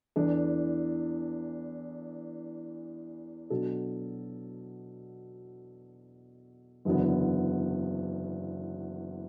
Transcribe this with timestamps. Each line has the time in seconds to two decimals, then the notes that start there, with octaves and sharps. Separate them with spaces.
0.16 E2 E3 D4 A4
3.50 B2 F#3 D4 A4
6.85 F#1 E2 D3 F#3 B3